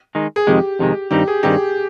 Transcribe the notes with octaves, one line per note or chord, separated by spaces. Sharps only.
D#3 G#3 D#4
G#4
F2 C3 D#3 G#3 G4
F2 C3 D#3 G#3
G2 D#3 G3 C4 D#4 G4
G#4
G2 D#3 G3 C4 D#4 G4